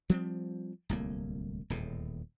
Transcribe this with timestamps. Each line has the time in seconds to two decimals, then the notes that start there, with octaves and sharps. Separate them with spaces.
0.10 F3 G3 B3 C4
0.89 D1 C2 A2 A#3
1.70 D#1 E2 A2